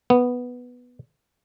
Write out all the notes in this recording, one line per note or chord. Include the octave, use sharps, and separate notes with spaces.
B3